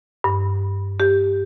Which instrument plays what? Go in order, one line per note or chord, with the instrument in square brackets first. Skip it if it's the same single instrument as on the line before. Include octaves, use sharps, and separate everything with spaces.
[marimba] G2
G4